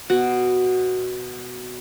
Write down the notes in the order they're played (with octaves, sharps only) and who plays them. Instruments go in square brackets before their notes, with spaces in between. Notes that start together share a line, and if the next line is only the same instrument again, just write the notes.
[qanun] B2 F#4